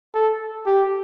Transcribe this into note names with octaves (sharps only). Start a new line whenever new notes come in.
A4
G4